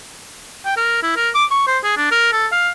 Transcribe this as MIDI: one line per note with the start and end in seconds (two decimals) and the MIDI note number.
0.65 0.74 79
0.77 0.99 70
1.03 1.14 64
1.16 1.29 70
1.35 1.45 86
1.51 1.65 85
1.67 1.78 72
1.83 1.94 68
1.97 2.08 62
2.11 2.32 70
2.32 2.46 69
2.52 2.70 77